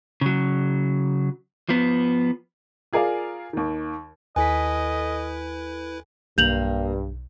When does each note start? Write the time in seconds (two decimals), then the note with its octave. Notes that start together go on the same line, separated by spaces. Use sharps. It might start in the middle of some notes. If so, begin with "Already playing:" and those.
0.21 C#3 F#3
1.69 F3 B3
2.93 F4 G#4 A#4 D5 F5
3.53 D#2 D#3
4.36 D#2 E4 A4 B4 D#5 G#5 B6
6.38 B1 G2 A#3 G6 F7 F#7